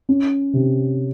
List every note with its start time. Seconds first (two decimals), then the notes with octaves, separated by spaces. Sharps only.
0.09 C#4
0.53 C3